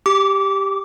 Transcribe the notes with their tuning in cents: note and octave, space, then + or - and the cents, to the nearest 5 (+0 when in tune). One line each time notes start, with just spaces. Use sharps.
G4 +5 D6 -20